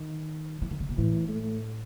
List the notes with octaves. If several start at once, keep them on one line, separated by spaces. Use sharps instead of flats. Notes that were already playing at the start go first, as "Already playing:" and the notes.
Already playing: D#3
E3
D#3
C#3
B2
A2 E3
A3